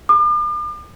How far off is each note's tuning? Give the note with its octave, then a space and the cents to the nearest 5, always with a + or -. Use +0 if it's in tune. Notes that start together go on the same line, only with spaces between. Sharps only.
D6 +40